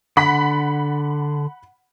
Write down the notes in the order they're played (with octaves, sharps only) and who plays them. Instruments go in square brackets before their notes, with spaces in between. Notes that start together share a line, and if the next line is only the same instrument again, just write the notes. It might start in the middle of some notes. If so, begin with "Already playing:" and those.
[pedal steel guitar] D3 [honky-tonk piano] F#5 B5 B6